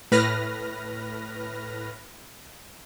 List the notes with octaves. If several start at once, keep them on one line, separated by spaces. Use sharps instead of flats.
A2 B4 F6 A#6